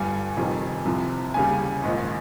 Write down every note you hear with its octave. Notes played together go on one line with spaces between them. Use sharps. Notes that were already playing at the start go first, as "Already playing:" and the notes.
Already playing: G1 G2 G3 G#5
F1 F2 D#3 G3
C2 C3 F3
D#2 C#3 G3 G#5
A#1 G#2 D#3